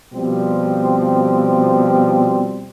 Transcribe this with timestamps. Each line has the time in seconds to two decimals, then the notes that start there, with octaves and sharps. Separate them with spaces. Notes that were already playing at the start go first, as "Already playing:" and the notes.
0.13 B2 F3 G3 C4